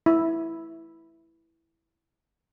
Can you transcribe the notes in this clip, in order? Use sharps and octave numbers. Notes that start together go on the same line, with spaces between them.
E4